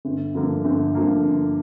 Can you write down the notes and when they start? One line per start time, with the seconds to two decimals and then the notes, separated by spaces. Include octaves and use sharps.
0.05 G1
0.35 G2 D3 F3 A#3
0.65 G1
0.95 G2 D3 F3 A#3
1.24 G1